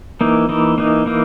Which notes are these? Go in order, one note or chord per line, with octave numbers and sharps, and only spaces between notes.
E3 A#3 D#4
E3 A#3 D#4
E3 A#3 D#4
E3 A#3 D#4